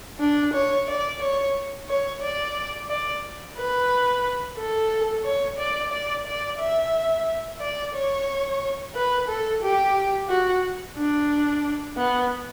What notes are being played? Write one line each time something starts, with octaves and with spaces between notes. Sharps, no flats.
D4
C#5
D5
C#5
C#5
D5
D5
B4
A4
C#5
D5
D5
D5
E5
D5
C#5
B4
A4
G4
F#4
D4
B3